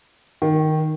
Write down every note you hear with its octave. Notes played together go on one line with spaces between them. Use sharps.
D#3